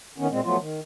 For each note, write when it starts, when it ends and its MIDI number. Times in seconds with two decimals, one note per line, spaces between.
0.18 0.27 51
0.18 0.27 59
0.18 0.27 61
0.31 0.40 46
0.31 0.40 56
0.31 0.40 60
0.44 0.57 53
0.44 0.57 54
0.44 0.57 57
0.44 0.57 59
0.44 0.57 65
0.59 0.80 51